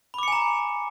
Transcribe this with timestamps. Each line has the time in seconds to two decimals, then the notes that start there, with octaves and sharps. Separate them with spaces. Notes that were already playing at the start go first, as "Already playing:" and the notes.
0.14 B5
0.18 D6
0.23 C#7
0.28 G#5
0.32 A#5